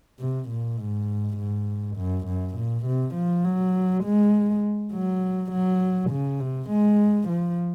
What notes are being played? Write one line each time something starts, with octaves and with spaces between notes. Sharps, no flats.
C3
A#2
G#2
G#2
F#2
F#2
A#2
C3
F3
F#3
G#3
F#3
F#3
C#3
C3
G#3
F3